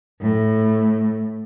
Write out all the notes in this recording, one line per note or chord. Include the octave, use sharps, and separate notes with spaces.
A2